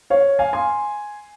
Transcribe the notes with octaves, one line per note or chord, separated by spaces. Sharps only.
C#5 F5
F5 G#5
G#5 C6